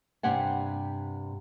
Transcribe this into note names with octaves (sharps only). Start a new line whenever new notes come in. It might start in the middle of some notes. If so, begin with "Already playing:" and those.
G2 C3 G4 F#5 G#5